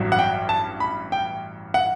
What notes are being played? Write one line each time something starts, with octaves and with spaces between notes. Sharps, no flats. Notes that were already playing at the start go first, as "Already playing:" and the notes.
Already playing: A1 G2 F#3
F#5
G5
A5
B5
G5
F#5